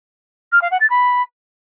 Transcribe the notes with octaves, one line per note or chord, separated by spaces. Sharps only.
F6
F5
F#5
A6
B5